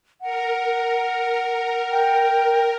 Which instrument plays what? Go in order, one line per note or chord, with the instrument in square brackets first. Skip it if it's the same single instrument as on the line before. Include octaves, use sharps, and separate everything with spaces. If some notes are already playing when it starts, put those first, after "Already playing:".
[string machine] A#4 [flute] F#5
[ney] G5